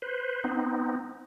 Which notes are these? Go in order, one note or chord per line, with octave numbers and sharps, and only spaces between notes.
B4 C5
B3 C4 D#4